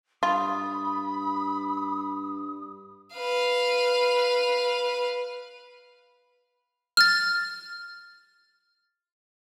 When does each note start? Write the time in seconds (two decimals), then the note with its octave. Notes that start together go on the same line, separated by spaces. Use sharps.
0.23 G2 F4 B5 D#6
3.15 B4 F5
6.97 F6 A6